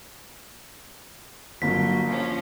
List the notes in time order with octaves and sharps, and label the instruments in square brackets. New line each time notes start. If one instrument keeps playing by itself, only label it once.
[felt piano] G1 A#3 [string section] F#3 [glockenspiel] B6
[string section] F3 C#4